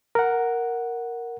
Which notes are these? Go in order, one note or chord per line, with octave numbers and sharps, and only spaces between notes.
A#4 F#5